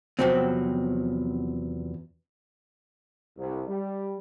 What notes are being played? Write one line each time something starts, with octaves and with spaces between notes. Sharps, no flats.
E2 G2 C3 F3 F#3 C4
C2
G3